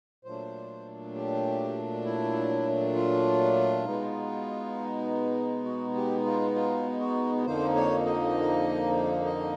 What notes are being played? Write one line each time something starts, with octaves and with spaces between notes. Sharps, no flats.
A#2 F#3 A3 D4 C5
G4
E4
F4
B2 G#3 B3 D#4
F#4
G4
F4
F4
F#4
F2 D3 F3 A#3 D#4 C5
C#5
D#5
D#5